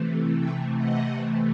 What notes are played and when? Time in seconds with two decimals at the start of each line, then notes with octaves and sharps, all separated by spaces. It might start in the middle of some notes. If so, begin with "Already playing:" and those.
Already playing: C3 E3 A3
0.37 E5 G5
0.76 D#5 F#5